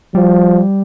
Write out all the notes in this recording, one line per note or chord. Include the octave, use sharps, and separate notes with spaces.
F3 G3